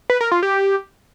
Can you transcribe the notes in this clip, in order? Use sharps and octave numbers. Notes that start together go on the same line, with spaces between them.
B4
A#4
F4
G4